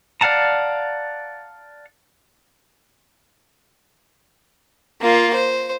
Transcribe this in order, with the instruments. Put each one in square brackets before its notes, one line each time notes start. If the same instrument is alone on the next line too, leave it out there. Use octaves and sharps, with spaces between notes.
[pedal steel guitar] D5 F5 F#5 A5 A#5
[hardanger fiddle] A#3 F4
C5